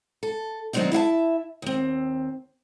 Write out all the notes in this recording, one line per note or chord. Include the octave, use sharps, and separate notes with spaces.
A4
D#3 F#3 A3 C4 D4 D#4
E4 E5 F5 A5
D#2 C4